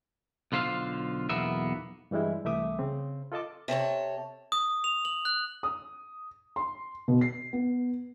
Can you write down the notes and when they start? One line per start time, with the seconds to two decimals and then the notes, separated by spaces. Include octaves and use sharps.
0.52 B1 D3 F4 C5 F5
1.29 B1 E2 A#3 B3 E5
2.11 G2 E3 G3 G#3 E4
2.45 C2 E3 A3 E5 D6 D#6
2.79 C#3 C4
3.32 F4 A4 D#5 A5 D6
3.68 C3 A4 C5 C#5
4.52 D#6
4.84 F7
5.05 F#7
5.25 F#6
5.63 D#6
6.56 C6
7.08 B2
7.21 C7
7.53 B3